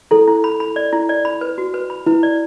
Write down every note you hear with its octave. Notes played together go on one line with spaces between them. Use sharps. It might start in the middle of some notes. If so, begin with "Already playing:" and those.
E4 A4
E4
B5
B5
D5
E4
D5
B5
B4
F#4
B4
B5
E4 B4
D5